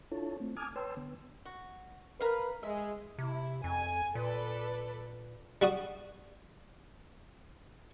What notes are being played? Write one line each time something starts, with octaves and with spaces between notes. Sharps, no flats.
D4 E4 F4 A4 C#5 A5
A3 C4
G#5 A5 D6 D#6 F6 G#6
B4 C#5 G5 A5 C6 E6
D3 B3
F#4
A#4 B4 F5
G#3 E5
C3 E4
F2 G#5
A#2 A4 B4 D5
G3 F#4 D#6